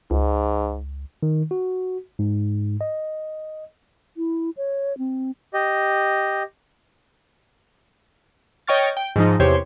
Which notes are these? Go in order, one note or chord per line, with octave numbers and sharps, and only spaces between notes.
C#2 G#2
D#3
F#4
G#2
D#5
E4
C#5
C4
G4 D#5
C#5 D#5 G5 C#6 F6 A6
G5
G#2 F3 D#4
E2 C3 G4 C5 C#5 C6